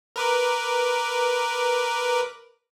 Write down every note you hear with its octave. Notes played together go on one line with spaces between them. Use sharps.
A#4 B4 D6